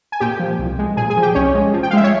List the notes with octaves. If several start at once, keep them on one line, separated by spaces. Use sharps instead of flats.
G#5
A#2 G4 G5
F3
C2
G#3
A#2 G#4 G#5
G#4 G#5
F3
G4 G5
C2 C#4 C#5
G#3
F3
G5
F5
G#3 E5
C#5